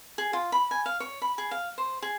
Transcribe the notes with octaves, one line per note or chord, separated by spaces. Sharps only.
G#4
F4
B5
G#5
F5
C#5
B5
G#4
F5
C5
G#4